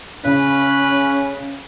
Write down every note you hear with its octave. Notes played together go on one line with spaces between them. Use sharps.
C#3 C#4 B4